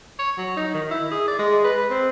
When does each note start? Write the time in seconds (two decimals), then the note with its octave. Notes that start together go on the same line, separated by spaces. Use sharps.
0.19 C#5
0.38 F#3
0.57 D#4
0.74 D#3
0.91 E4
1.11 G#4
1.28 D5
1.39 G#3
1.65 B4
1.91 C4